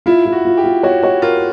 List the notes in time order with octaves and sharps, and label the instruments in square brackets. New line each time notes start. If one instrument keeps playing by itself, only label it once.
[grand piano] E4 [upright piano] F4
[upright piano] F4
[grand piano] F#4
[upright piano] F4
[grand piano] G4
[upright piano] F4
[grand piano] F#4 [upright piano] C#5
[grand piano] F#4 [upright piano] C#5
[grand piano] F4 [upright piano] A#4